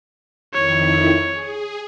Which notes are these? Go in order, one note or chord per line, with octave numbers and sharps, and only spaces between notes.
F2 D#3 E4 C#5
G#4